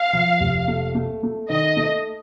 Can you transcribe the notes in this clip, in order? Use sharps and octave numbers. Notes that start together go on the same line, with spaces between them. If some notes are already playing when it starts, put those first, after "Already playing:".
Already playing: F5
F3
F1
A3
A3
A3
D#3 D#5
A3